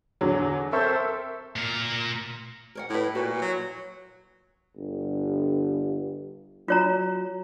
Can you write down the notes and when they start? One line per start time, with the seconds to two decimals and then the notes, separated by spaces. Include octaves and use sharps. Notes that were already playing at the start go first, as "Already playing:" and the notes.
0.21 E2 D3 F#3
0.72 C4 A4 A#4 C5 E5 C#6
1.56 A#2 A#4
2.75 A#4 C#5 F#5
2.90 A2 E4 B4
3.15 A#2 F#4 B4
3.42 F#3
4.76 G1
6.68 F#3 F4 C#5 A#5